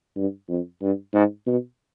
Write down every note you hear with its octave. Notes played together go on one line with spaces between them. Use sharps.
G2
F2
G2
G#2
B2